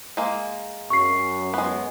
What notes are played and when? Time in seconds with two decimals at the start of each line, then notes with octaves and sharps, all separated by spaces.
0.17 G#3 A#3
0.90 F#2 C#6 C7
1.54 G#3 B3